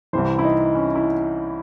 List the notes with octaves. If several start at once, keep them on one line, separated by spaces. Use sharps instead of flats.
C2 C3 E3 C5
E4
D#4
C#4
E4